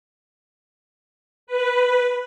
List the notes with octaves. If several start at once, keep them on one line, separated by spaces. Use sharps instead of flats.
B4